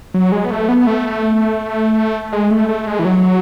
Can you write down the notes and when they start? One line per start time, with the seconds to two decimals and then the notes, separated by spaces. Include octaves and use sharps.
0.14 F#3
0.32 G#3
0.45 B3
0.51 A3
0.69 B3
0.87 A3
2.33 G#3
2.51 A3
2.69 A3
2.87 G#3
2.99 E3
3.05 F#3